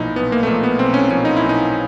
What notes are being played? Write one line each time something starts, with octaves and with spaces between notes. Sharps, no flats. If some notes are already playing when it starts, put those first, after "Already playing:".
Already playing: B1 A#2 F3 D#4 E4
B1 B3
A#3
A3
A#2 F3 A#3
B3
B1 C4
C#4
A#2 F3 C#4
D#4
B1 E4
D#4